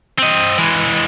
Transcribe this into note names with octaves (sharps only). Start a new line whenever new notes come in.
C4 D#5
E3 G#3